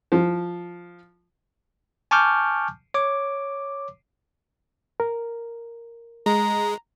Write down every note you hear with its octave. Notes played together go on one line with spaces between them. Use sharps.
F3
G#5 A5 C#6 D6 F6 G6
C#5 D6
A#4
G#3 A#5